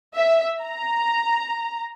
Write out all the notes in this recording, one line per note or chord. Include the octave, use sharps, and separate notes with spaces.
E5
A#5